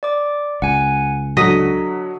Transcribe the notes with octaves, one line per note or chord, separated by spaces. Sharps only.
D5 D6
C#2 F#5 G#5
D3 F#3 F#4 D#5 B6